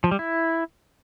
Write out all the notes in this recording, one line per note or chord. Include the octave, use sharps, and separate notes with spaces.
F3
G3
E4